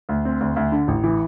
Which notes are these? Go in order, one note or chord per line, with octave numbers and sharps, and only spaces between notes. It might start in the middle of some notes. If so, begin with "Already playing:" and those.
D2
C4
D2
D2
D3
A1
E3